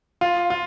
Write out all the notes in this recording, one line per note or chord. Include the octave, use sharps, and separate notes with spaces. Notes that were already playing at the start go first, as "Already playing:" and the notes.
F4
F4